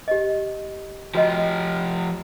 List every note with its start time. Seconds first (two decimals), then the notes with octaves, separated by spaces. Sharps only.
0.08 G4 D#5
1.15 F3 F#4 G4 D#5